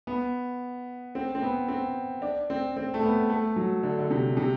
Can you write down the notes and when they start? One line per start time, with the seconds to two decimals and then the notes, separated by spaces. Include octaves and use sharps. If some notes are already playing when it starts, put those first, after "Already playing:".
0.07 B3
1.15 C4
1.35 C4
1.42 B3
1.68 C4
2.22 D4
2.50 C4
2.77 C4
2.94 A3
3.03 B3
3.30 A3
3.56 F#3
3.83 D3
3.99 D3
4.10 C3
4.37 C3